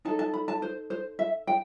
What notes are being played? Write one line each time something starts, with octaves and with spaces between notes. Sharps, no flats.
D#4 A4 A5
A5
B5
A5
C5
C5
E5
G5